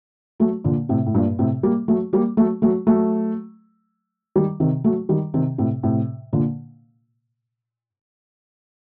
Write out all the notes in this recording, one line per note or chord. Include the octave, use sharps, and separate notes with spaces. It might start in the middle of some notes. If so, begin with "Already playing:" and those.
F#3 A3
A#2 D3
A2 C3
A2
G2 A#2
A2 C3
G3 A#3
F#3 A3
G3 A#3
F#3 A3
F#3 A3
F#3 A3
D#3 G3
C3 D#3
F#3 A3
D#3 G3
C3 D#3
A2 C3
A2 C3
A#2 D3